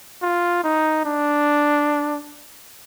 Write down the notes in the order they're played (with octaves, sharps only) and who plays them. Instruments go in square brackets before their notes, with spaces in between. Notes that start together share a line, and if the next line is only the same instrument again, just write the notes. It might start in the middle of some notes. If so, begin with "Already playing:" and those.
[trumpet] F4
D#4
D4